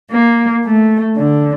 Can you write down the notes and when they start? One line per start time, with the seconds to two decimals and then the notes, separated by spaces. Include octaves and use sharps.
0.12 A#3
0.64 A3
1.17 D3